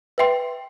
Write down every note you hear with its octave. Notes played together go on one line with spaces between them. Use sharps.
B4 E5 G5 C6